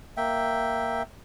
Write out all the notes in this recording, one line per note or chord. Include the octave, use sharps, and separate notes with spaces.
A#3 E5 G5